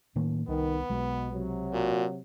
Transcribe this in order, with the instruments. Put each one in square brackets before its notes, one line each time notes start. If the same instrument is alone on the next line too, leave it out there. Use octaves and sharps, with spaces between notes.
[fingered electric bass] A2 D#3 A#3
[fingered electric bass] C2 [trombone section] D#3 [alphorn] B3
[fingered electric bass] B1 G#3 [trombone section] B2
[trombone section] C3 F#3
[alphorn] A#2 [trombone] F#4